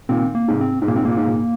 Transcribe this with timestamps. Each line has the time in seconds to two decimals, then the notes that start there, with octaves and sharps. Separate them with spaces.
0.09 A#2 D#3 C4
0.35 A#3
0.48 G#2 C3
0.61 C4
0.82 G#2
0.88 A#2 A#3
0.96 G#2 C4
1.05 A#2 A#3
1.17 G#2
1.27 A#2